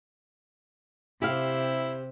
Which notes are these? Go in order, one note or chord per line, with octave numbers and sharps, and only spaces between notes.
C3 C4 E4 G4 F5